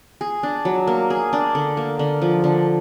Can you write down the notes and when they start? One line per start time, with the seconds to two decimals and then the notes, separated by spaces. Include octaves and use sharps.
0.21 G#4
0.43 D4
0.65 F#3
0.87 A#3
1.10 G#4
1.33 D4
1.55 D3
1.77 A#3
1.99 D3
2.22 F3
2.44 D3